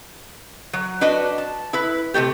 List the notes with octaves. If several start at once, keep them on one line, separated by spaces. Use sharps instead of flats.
F#3
D4 F#4 B4 D#5
A5
E4 B4
C3 E3 A3 G4